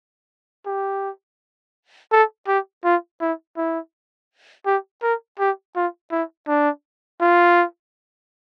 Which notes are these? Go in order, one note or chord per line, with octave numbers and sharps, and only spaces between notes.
G4
A4
G4
F4
E4
E4
G4
A#4
G4
F4
E4
D4
F4